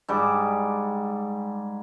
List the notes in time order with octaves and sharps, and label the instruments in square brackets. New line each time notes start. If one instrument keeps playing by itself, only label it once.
[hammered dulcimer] G#2 G3 D6